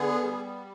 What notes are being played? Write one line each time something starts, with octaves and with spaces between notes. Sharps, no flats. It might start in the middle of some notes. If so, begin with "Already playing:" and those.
Already playing: D3 B3 G#4
G3